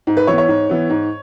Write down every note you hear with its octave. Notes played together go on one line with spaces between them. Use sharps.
G#2
B4
E3 B3 C#5
C#5
G#2
E3 B3
G#2